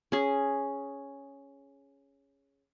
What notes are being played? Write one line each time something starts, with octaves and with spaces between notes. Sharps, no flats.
C#4 G#4